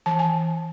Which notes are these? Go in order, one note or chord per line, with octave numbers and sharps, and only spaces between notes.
E3 A5
G#5